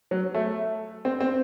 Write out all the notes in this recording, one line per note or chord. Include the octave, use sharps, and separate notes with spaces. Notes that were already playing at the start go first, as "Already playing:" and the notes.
F#3
A3
C4
C4